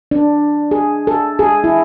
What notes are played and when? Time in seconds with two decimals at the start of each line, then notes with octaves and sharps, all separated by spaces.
0.11 D4
0.71 G#4
1.07 A4
1.39 G#4
1.64 E4